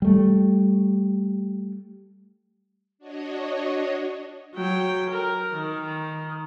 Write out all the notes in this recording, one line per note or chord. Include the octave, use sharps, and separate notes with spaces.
G3 A3
D4 F#4 C#5 D#5
F#3 G5
A#4
D#3